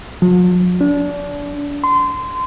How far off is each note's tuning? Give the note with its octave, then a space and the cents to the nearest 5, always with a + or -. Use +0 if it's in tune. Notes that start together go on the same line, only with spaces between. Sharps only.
F3 +45
D4 -30
C6 -25